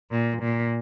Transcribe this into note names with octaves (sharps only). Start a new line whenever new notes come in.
A#2
A#2